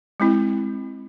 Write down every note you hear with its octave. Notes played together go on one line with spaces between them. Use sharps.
G#3 C4 E4